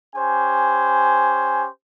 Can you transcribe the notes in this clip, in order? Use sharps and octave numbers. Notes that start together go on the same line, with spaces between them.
C#4 G4 C5 G#5